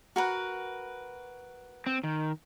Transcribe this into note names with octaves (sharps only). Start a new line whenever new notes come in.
F#4 A#4 B4
C4
D#3